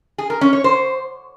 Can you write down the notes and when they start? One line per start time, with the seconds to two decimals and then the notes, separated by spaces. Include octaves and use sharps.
0.18 G#4
0.30 A#4
0.41 C#4
0.53 C#5
0.64 C5